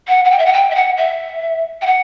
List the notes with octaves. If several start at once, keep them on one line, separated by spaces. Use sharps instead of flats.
F#5
F#5
G5
E5
F#5
G5
E5
F#5
E5
G5
F#5